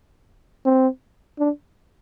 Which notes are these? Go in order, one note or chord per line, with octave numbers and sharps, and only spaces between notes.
C4
D4